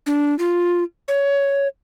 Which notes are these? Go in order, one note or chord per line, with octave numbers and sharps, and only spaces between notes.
D4
F4
C#5